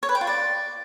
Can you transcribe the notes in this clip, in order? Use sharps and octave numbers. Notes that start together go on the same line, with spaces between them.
C#5
B4
G5
F4
D5